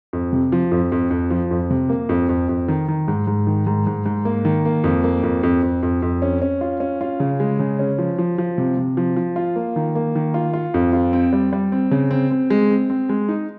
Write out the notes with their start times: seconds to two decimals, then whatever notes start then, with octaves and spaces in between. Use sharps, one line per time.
0.13 F2
0.33 C3
0.52 F3
0.72 F2
0.92 F2
1.10 F2
1.30 F3
1.51 F2
1.70 C3
1.89 A#3
2.09 F2
2.29 F2
2.49 F2
2.68 D#3
2.88 D#3
3.08 G#2
3.27 G#2
3.47 D#3
3.67 G#2
3.87 G#2
4.06 G#2
4.25 A#3
4.45 D#3
4.65 A#3
4.84 F2
5.04 A#3
5.23 F2
5.43 F2
5.63 F2
5.83 F2
6.02 F2
6.22 C#4
6.42 C#4
6.61 F4
6.80 C#4
7.01 F4
7.20 C#3
7.40 G#3
7.59 C#3
7.79 C#4
7.98 F3
8.18 F3
8.38 F3
8.58 C3
8.77 C3
8.97 F3
9.16 F3
9.36 F4
9.56 A#3
9.76 D#3
9.95 A#3
10.15 D#3
10.34 F4
10.53 F4
10.74 F2
10.93 F4
11.13 C4
11.33 G3
11.53 G3
11.72 C4
11.91 C#3
12.11 C4
12.31 C4
12.50 G#3
12.70 C4
12.90 C4
13.09 G#3
13.29 D#4